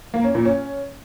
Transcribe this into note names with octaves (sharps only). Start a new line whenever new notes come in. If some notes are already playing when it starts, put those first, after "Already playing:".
A#3
C#4
A#2
C#4